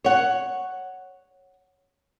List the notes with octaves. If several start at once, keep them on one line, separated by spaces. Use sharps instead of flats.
C#5 F#5